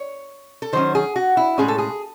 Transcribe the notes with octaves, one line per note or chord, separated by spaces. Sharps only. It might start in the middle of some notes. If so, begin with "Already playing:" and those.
Already playing: C#5
A4
D#3 F#3 C#4 C5
G#4
F#4
E4
A2 G#3 C#4 G#4
A4
G#4